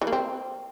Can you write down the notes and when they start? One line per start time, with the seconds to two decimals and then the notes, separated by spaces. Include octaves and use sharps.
0.01 E3
0.07 A#3
0.13 C4